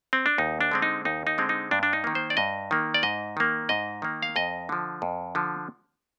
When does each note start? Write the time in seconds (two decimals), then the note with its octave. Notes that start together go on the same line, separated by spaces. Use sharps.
0.13 C4
0.26 D4
0.38 D#2 D#4
0.61 D4
0.72 D3 G#3 C4
0.82 D#4
1.05 D#2 D#4
1.27 D#4
1.38 D3 G#3 C4
1.49 D#4
1.71 G2 D4
1.83 D4
1.93 D#4
2.04 D#3 A#3
2.15 C5
2.30 D5
2.37 G2 D#5
2.71 D#3 A#3
2.94 D5
3.03 G#2 D#5
3.37 D#3 A#3
3.69 G#2 D#5
4.02 D#3 A#3
4.23 F5
4.36 F2 D#5
4.69 D3 F3
5.02 F2
5.35 D3 F3